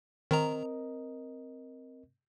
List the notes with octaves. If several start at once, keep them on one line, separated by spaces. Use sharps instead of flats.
D#3 C4 A#4 D#5 A#5